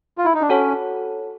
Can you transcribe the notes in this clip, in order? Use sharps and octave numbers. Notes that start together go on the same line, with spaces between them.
F4
E4
D#4
D4
C#4 F#4 A4 C#5 F#5 A5